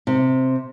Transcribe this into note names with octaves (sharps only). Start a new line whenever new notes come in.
C3